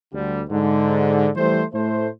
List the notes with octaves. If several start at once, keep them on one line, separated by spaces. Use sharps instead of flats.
D2 D3 G3
G#2 D3
E3 G3 A3 C5
A2 A3 C5